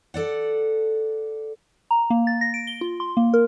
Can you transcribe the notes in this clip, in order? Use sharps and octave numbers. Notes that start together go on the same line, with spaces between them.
A4 D5 F#5
A#5
A#3
A6
A#6
D7
G7
F4
C6
A#3
A#4